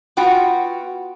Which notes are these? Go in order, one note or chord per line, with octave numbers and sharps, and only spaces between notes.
B3 F4 F#4 G5